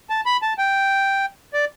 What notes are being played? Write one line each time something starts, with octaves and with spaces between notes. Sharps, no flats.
A5
B5
A5
G5
D5